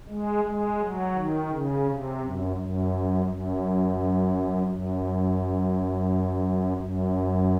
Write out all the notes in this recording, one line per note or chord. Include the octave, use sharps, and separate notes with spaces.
G#3
G#3
F#3
D#3
C#3
C3
F#2
F#2
F#2
F#2
F#2